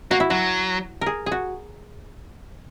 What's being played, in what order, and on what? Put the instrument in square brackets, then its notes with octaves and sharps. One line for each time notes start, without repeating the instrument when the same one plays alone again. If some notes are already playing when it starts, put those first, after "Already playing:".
[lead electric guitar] A#3 [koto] F#4
[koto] E4
[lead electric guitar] F#3 [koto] F#4
[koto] G#4 A#4
G#4
F#4